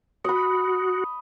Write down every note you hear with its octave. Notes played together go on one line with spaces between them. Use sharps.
F#4 D#5 B5